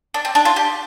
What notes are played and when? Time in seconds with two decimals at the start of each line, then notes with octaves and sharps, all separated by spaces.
0.14 D4
0.25 C4
0.35 D4
0.45 F4
0.56 G4